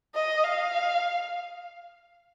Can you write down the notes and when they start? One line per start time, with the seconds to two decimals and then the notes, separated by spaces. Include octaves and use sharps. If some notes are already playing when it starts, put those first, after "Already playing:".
0.15 D#5
0.44 F5